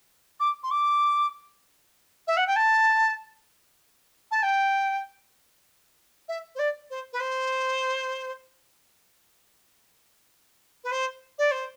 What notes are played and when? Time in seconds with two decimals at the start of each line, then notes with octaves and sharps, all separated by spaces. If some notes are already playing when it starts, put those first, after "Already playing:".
0.40 D6
0.63 C6
0.71 D6
2.28 E5
2.37 F#5
2.47 G5
2.56 A5
4.31 A5
4.43 G5
6.28 E5
6.55 C5
6.59 D5
6.90 C5
7.13 B4
7.20 C5
10.84 B4
10.92 C5
11.38 D5
11.51 C5